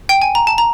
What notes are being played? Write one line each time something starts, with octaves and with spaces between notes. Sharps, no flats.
G5
G#5
A#5
A5
A#5